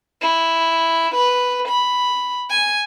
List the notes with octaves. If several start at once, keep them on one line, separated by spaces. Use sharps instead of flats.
E4
B4
B5
G#5